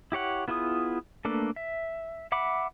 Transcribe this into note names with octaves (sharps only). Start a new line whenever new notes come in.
E4 G4 C#5 F#5
B3 E4 F4 G#4 D#6
A3 A#3 D4 A4 B4
E5
E5 F#5 B5 D6